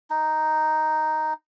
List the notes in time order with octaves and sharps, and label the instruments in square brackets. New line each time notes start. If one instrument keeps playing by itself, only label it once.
[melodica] D#4